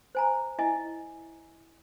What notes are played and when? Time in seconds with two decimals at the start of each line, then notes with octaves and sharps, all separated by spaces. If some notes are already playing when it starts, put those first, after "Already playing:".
0.15 C5 G#5 A#5
0.59 E4 D#5 E5 G#5